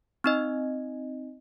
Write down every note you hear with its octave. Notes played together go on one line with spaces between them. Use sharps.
C4 D#4 D#5